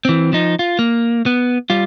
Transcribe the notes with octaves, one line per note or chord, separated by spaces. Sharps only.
E3 C4
F3 D#4
F4
A#3
B3
G3 F4